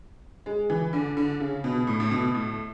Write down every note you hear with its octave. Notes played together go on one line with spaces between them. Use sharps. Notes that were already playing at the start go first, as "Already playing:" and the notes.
G#3
E3
D3
D3
C#3
B2
A2
A2
B2
A2